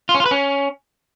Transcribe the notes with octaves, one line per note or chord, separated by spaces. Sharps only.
F4
C#4
F4
B4
C#4